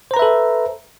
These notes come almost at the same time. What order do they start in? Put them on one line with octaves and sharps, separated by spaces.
C5 A#5 B4 E5 A4